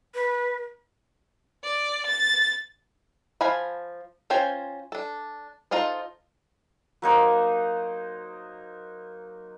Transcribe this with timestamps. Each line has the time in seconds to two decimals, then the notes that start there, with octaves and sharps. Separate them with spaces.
0.15 B4
1.64 D5
2.07 A6
3.41 F3 F5 G#5 B5
4.30 C#4 F4 C5 G5 G#5
4.92 D4 A4
5.71 D#4 F4 A4 C5
7.02 F#3 A#3 D#4 C5